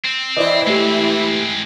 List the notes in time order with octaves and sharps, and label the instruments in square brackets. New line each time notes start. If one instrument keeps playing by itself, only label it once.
[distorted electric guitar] C4
[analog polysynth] E3 E4 [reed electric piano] C5 D5 D#5
[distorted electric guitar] G#3 C4 [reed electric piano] A3 G4